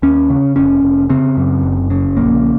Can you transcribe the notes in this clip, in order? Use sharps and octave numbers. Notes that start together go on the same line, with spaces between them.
D#2 C#4
C#3
F1 C#4
F1
C#3 C4
F#2
F#1
C#3
A#1 A#3